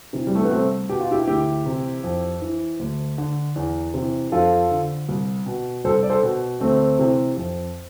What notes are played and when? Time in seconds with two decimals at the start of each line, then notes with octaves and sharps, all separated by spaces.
0.13 C3 E3
0.27 G3
0.35 A3
0.43 B3
0.51 C2 A3 C4
0.89 B2 G4
1.00 F4
1.11 E4 G4
1.27 D2 E4 G4
1.66 C3 E3
2.04 F2
2.42 E3
2.79 D2
3.18 D3
3.56 E2
3.94 C3 E3
4.32 F2 F4 A4
4.71 D3
5.08 C2
5.46 B2
5.84 C2 A4 C5
6.03 D5
6.10 A4 C5
6.23 B2
6.60 D2 A3 C4
6.99 C3 E3
7.37 F2